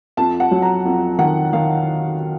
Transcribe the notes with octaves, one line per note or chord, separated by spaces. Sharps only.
F2 A5
F#5
F#3
A#5
F2
D#3 F#5
D#3 F5